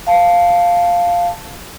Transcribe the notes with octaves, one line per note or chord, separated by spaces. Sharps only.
F5 A5